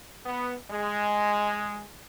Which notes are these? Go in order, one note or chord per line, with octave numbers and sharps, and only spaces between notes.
B3
G#3